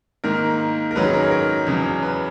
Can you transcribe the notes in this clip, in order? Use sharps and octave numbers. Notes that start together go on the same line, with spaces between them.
G#2 D#3 A#3 A#4
A#4
G#2 D#3 F#3 C#4 B4
G#4
A#4
C#5
A#4
E2 C#3 F#3
B4